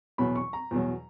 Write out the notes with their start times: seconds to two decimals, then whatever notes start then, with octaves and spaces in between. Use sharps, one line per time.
0.18 E2 B2 F#3 B5
0.36 C#6
0.53 A#5
0.71 E2 B2 F#3